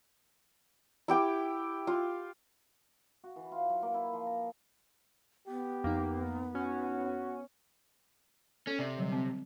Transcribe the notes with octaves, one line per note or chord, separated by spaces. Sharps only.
E4 G4 G5 D6
F4
F#4
E3
F4
F#3
A#3
E4
F3
A#5
B3 G4
F2 A#3 D#4
C#4 F#4
C#4 A4
C3 D5
D3 F#3 G3
C4